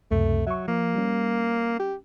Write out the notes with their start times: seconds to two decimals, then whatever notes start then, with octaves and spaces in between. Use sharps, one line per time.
0.11 C#2 F#2 C3 A3
0.47 F#3 E5 C#6
0.68 F3 A#3
0.95 G3 C#4
1.79 G4